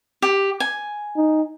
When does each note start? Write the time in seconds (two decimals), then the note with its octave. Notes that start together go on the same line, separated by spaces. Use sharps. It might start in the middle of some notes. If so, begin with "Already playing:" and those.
0.22 G4
0.60 G#5
1.17 D#4